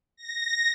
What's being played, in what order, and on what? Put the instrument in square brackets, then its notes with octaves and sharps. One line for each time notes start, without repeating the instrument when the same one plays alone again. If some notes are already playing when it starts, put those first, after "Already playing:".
[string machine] A#6